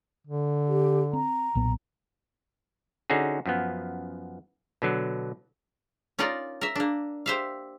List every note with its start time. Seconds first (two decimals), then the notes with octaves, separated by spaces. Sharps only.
0.27 D3
0.68 G4
1.13 C4 A#5
1.55 B1 A#2 B3
3.10 D3 C#4 D#4 F#4 G#4
3.46 F#2 F3 B3
4.82 B2 D3 F#3
6.19 C#4 D#4 F4 A#4 D5
6.61 A#4 E5
6.75 A#3 D4
7.26 G4 C5 E5 F5